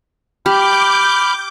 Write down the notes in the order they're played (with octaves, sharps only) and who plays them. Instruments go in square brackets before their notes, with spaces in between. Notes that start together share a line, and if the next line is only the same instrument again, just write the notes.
[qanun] G4 [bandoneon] B5 F6 [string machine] D6 G6